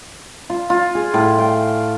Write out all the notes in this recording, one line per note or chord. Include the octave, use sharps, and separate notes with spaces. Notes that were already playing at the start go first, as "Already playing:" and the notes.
F4
F4
G#4
A2
G5